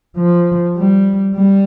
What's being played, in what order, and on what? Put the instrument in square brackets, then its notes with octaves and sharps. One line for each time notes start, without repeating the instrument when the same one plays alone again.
[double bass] F3
G3
G3